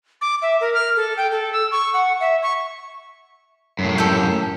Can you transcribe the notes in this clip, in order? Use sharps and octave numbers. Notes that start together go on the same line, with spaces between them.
D6
E5
A#4
F6
A4
G5
A4
E6
C#6
F#5
E5
C#6
F#2 A2
G4 A4